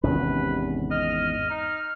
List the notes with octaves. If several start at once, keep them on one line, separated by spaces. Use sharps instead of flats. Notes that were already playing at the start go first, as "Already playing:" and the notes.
G#1 E2 C3 C#4 B4
D#5 F6
D#4